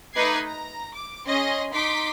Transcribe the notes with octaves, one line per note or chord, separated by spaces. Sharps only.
A3 D#4 B4 D6 G#6 C7
A#5
D6
C#4 G#4 D#5 C6 A#6
D#4 C6 D6 B6